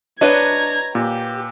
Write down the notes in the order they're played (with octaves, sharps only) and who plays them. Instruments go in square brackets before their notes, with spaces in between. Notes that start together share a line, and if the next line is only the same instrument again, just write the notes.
[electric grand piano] D4 [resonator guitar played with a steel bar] B4 C#5 D#5 [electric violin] A#5 G#6
[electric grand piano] A#2 [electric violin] G4